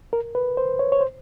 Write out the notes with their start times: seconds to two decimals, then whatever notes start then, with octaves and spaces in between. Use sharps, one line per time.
0.13 A#4
0.35 B4
0.57 C5
0.79 C#5
0.92 C#5
1.01 C5